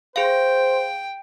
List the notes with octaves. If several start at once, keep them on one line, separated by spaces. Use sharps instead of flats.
G#4 C5 F5 G5